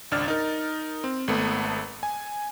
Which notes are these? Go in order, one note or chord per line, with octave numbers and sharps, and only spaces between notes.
G#1 C#2 D4 F6 A6
D#4 A#4
C4
G#1 A3 B3
G#5